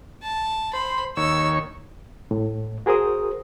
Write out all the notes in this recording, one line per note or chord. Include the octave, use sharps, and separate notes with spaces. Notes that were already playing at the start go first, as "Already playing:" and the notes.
A5
C5 B5
D#2 C#5 E6
A2
F#4 G#4 A#4 C5 D#6